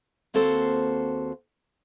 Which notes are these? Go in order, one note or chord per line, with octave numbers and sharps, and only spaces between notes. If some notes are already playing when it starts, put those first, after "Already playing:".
D#2 A#3 C4 F#4 A4 C5